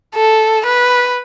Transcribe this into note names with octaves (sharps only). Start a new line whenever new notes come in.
A4
B4